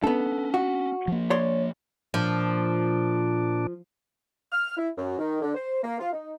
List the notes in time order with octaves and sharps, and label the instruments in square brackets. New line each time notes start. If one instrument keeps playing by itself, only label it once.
[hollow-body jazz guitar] B3 A4 [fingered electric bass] C#4 D4
[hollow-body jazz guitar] F#4
[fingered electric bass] F3 A#3
[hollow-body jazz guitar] C#5 D5 C6
[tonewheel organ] A#2 D4 [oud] F3
[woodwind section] F6
E4
F#2
D#3
D3
C5
A#3
F4
D#4